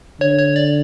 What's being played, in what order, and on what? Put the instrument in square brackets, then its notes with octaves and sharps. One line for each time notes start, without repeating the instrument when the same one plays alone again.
[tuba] D3 [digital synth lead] C#5
[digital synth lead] C#5
D5